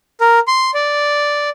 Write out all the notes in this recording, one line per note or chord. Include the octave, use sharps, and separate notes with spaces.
A#4
C6
D5